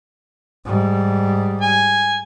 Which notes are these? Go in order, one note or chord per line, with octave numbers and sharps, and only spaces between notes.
G#2 G3
G#5